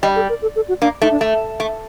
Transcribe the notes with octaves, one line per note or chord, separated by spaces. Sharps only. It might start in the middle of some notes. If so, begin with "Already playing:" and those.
G3 D#5
A4
A#4
A4
A4
F#4
A#3 D4
A3 D#4
D4
A3
A3